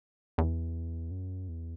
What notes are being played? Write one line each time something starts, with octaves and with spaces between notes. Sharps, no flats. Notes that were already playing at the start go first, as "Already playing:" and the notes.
E2
F#2
E2